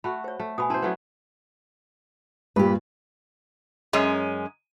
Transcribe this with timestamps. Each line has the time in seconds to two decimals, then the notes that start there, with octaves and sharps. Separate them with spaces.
0.04 A3 F#4 B5
0.24 C5 C#5
0.40 A3
0.58 B2 G#5 B5 D#6
0.70 C#4 E4 C5 A5 C6
0.82 F#3 A3 B3
2.56 G2 A#2 G4 B4
3.93 F#2 G#3 C#4